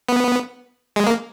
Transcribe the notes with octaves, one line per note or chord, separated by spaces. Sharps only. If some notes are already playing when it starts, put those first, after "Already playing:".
B3
G#3
A#3